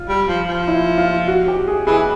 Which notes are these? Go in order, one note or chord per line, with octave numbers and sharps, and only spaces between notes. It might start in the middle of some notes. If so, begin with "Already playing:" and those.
Already playing: F4
G3
F3
F3
E4
F4
F#4
G4
G#4
E3 G#4